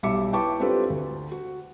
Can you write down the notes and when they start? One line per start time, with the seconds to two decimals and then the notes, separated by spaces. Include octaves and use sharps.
0.03 B1 G3 E5 D6 C#7
0.33 E4 B4 G5 A5 C#6 D6
0.60 C4 D4 F4 G4 A4 B4
0.90 D2
1.32 F#4